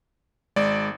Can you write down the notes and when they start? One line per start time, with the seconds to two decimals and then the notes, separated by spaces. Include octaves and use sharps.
0.56 G#1 G#3 D5